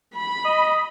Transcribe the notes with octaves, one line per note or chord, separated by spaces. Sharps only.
B5
D#5